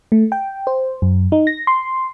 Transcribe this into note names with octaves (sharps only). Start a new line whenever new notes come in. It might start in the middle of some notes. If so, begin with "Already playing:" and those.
A3
G5
C5
F#2
D#4
A#6
C6